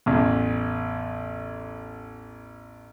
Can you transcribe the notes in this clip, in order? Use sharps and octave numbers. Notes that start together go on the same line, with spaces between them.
A1 E2